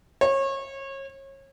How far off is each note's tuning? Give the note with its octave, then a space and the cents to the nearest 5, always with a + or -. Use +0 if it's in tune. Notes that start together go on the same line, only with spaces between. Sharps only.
C#5 -30